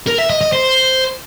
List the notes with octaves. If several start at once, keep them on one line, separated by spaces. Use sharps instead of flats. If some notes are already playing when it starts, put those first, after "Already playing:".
A#4
E5
D#5
D#5
C5